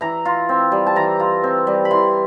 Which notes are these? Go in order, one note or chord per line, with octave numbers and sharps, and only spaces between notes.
E3 A#5
F4
C4
G3
A5
E3 A#5
F4
C4
G3
B5
E3 C6